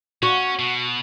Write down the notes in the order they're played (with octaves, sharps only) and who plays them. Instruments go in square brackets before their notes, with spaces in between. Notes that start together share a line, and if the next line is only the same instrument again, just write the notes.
[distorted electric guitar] C#4 [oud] F#4
[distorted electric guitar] B2